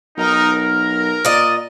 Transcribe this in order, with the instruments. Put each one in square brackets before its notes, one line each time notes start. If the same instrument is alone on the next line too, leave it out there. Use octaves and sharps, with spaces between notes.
[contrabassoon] B1 [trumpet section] D#4 A#4
[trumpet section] A#4
[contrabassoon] A#2 [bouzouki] D5 D#5